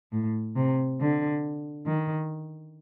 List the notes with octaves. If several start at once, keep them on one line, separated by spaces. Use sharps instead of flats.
A2
C3
D3
D#3